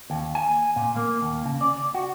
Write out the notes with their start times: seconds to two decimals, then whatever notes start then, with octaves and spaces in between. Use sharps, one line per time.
0.10 D#2
0.35 G#5
0.76 A#2
0.96 A#3
1.21 D#2
1.46 C#3
1.61 D5
1.94 F#4